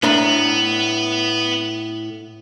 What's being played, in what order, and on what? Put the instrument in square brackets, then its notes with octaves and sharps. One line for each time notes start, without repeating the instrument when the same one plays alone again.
[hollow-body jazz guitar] A2 D4 A#5 [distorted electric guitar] B3